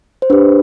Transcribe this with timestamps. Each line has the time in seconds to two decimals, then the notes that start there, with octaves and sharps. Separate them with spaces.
0.22 C5
0.30 D4 G4 B4